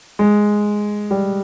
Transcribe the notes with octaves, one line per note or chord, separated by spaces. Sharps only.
G#3
G3